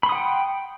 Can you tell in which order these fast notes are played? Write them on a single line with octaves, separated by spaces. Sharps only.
B5 C6 D#6 F#5 G5